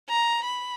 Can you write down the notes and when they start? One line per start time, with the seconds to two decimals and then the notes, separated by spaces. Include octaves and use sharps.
0.09 A#5
0.45 B5